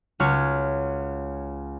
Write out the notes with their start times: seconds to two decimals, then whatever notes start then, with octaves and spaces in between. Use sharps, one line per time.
0.20 C#2 F#4 C#5 F6